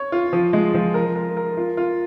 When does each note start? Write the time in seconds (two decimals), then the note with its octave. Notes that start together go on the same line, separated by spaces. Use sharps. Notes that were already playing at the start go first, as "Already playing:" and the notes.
Already playing: C#5
0.12 F4
0.33 F3
0.53 G#3
0.74 F3
0.94 A#4
1.16 A#4
1.37 A#4
1.57 F4
1.77 F4